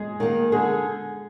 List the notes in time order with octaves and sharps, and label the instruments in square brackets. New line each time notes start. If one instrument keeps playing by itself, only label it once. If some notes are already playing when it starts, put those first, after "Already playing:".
Already playing: [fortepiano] G#3 G#4
[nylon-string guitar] D#3 A#3
[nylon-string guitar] D3 [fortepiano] G#3 G#4